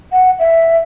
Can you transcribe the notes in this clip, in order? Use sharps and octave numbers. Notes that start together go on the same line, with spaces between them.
F#5
E5